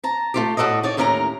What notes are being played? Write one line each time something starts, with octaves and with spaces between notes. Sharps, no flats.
A5 A#5
A3 F4 G4
A2 F#4 A4 D5 D#5
D#4 C#5 D5
D#2 A2 C#4 A#4 E5 A#5